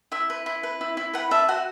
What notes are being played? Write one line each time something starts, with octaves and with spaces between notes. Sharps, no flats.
E4 E5
B4
E4
B4
E4
E4
B4 F#5 B5
B4 E5 A5
F#4 F#5